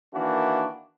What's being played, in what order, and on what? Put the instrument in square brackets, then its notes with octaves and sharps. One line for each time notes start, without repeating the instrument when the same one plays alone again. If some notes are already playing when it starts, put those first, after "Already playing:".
[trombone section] D#3 E3 A#3 D4 E4 F#4